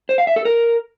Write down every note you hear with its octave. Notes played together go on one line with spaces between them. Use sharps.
C5
F5
E5
A4
A#4